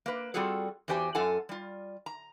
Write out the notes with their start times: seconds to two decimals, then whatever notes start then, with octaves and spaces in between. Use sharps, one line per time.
0.06 A#3 B4
0.34 G3 C4 F4 F#4 G#4 A4
0.88 E2 F#4 G4 C5 G#5
1.15 F#2 F4 A4 F#5 G#5
1.49 G3 F4
2.06 A#5